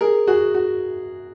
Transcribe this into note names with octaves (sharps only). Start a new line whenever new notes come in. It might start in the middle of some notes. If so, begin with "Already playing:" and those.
G#4 A#4
F#4 G#4
F#4